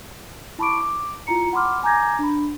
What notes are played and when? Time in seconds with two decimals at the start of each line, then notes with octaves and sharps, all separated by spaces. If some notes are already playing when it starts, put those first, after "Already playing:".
0.58 E4 A5 B5 C#6 D6 D7
0.78 D6
1.27 E4 F4 A#5 C#7
1.53 F#5 B5 C6 D6 F6
1.83 G#5 A#5 D6 G6 G#6 A#6
2.19 D4 B5